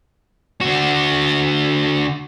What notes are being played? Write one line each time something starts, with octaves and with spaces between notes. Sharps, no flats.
D3 F#4